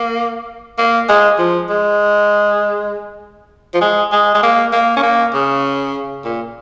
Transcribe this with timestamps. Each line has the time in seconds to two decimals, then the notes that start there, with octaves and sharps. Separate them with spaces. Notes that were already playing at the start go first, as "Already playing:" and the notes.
Already playing: A#3
0.78 A#3
1.09 G#3
1.39 F3
1.70 G#3
3.74 F3
3.81 G#3
4.12 G#3
4.35 G#3
4.43 A#3
4.73 A#3
4.97 C#4
5.03 A#3
5.34 C#3
6.24 A#2